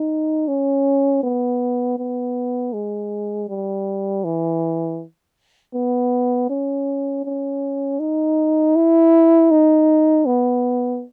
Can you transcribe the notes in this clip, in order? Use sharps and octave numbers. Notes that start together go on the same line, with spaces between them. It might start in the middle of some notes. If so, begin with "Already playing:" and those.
Already playing: D#4
C#4
B3
B3
G#3
G3
E3
B3
C#4
C#4
D#4
E4
D#4
B3